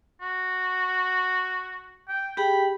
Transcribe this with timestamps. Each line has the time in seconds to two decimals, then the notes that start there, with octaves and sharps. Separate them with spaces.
0.21 F#4
2.08 G5
2.37 G4 G#4 G5 B5